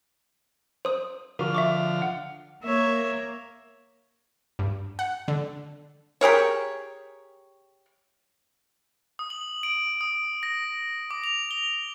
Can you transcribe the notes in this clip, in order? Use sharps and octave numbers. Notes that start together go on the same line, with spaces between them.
C5 D#6
D3 F3 F#4 A#4 F5
E5 C#6 D6
F#5
A#3 C#5 E5
G2
F#5
D3
G4 G#4 A#4 C#5
D#6
F#7
D7
D#6
A#6
D6
F7
G7